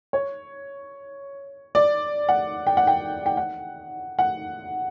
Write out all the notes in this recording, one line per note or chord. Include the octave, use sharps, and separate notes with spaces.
C#5
D5
F#5
G5
F#5
G5
G5
F#5
F#5